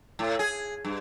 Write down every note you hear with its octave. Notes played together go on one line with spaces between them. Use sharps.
A2
G#4
G2